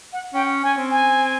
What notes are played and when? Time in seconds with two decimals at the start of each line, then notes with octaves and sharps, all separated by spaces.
0.13 F#5
0.34 C#4 G5
0.63 C#4 G#5
0.77 C4
0.91 G#5